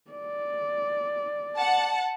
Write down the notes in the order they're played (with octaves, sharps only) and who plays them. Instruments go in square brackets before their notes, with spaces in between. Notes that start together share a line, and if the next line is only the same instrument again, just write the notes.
[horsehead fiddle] D5
[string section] F#5 A5